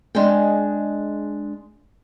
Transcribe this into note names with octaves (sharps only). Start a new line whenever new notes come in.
G#3 D4 G#4 D#5 G5